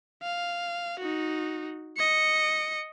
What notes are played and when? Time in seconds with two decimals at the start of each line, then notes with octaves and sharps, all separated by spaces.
0.22 F5
1.00 D#4 F#4
1.97 D#5 C#7